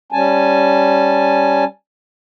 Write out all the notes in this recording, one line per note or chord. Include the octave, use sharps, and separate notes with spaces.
G3 C#4 G#5 A5